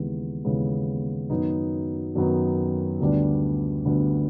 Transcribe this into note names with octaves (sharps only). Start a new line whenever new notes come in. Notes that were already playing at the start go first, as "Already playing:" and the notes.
Already playing: D#2 C#3 E3 G#3 B3
D#2 C#3 E3 G#3 B3
F#2 D#3 F#3 B3 D#4
F#2 D#3 F#3 B3 D#4
D2 D3 G3 B3 D4
D2 D3 G3 B3 D4